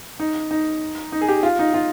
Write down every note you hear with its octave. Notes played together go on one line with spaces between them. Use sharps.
D#4
D#4
D#4
G#4
G4
F4
D#4
F4